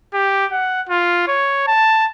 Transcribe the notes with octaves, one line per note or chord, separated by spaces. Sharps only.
G4
F#5
F4
C#5
A5